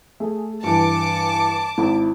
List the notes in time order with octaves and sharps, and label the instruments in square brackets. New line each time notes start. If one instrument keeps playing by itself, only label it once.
[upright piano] A3 [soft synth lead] G#4
[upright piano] G2 E3 [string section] A5 D6 [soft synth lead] C#7
[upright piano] G#1 B5 [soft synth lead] E4